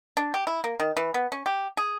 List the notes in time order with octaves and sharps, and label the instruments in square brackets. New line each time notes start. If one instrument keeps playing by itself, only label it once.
[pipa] D4
G4
E4
A#3
D#3
E3
B3
C#4
G4
G#4